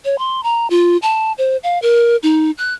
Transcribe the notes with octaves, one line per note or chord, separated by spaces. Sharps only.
C#5
C6
A#5
F4
A5
C5
F5
A#4
D#4
F#6